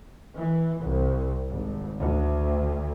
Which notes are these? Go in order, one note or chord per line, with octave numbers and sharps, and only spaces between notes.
E3
C2
G#1
D2